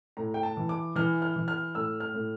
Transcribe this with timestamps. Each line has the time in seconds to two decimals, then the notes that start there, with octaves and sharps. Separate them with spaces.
0.17 A2 A#5
0.34 G5
0.43 A5
0.57 E3
0.69 D6
0.96 E3 F6
1.22 F6
1.36 E3
1.48 F6
1.75 A2 E6
2.00 F6
2.14 A2